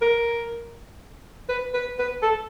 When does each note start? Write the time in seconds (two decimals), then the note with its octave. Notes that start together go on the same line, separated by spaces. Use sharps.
0.02 A#4
1.49 B4
1.74 B4
1.99 B4
2.23 A4